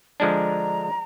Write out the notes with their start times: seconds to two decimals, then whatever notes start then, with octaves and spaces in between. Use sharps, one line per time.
0.20 D3 F3 G#3 D4 A#5